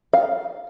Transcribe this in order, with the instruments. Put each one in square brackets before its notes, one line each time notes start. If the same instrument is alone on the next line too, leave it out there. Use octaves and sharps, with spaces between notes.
[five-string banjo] F5